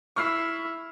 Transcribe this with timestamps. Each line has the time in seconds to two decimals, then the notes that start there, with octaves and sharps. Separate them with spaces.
0.16 E4 C#6 F6 C7